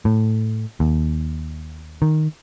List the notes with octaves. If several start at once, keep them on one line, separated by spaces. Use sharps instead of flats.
A2
D#2
D#3